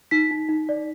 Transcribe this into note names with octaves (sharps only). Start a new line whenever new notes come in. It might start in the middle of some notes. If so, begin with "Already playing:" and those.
D#4 B6
D#4
D#4
D5